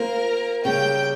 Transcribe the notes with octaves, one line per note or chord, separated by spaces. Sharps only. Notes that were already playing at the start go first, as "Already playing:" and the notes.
Already playing: A#3 F4 A#4 C5
C#3 G3 A#3 G5